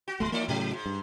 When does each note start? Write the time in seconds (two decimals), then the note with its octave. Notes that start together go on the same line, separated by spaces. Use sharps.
0.08 F#4
0.20 D1 D#2 G3 A3
0.32 E3 A#3 D#4 D5
0.48 A2 C#3 F3 A3
0.73 G#2
0.86 G2